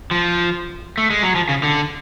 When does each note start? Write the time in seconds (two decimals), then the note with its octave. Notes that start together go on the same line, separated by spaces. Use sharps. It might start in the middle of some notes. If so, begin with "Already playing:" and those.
0.11 F3
0.98 A3
1.10 G#3
1.23 F#3
1.35 F3
1.49 C#3
1.63 D3